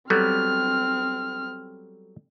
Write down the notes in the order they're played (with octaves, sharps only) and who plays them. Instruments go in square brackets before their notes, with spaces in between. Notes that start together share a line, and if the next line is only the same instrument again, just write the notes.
[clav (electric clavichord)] F#3 G3 B3 [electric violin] C4 F6 [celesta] A4